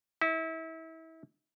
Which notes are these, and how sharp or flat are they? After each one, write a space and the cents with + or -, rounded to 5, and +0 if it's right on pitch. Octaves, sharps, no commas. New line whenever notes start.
E4 -30